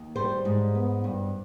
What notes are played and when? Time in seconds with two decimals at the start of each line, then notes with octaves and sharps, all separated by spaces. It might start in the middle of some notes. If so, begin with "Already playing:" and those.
Already playing: D#2
0.16 G3 C5
0.45 G#2
0.75 B3
1.04 G2